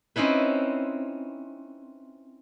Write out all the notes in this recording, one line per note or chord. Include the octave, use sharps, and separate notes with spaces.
C4 C#4 D#4 E4 B4